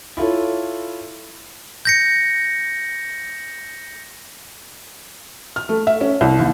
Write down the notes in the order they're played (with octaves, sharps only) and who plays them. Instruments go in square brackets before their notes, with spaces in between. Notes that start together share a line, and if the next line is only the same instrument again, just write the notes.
[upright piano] E4 F4 A4 C#5
[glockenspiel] G6 A#6 C#7
[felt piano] F6
A3
E5
C#4
C2
D#2